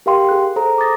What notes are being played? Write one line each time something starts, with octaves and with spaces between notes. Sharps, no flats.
G4 A#4 F5 G5 C6
G#4 F#6
G#4 A4 C5 A#5
D6 D#6 A6 A#6